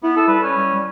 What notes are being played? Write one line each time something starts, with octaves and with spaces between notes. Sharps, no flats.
B3 E4
A4
G3 B4
C#4
G3
G3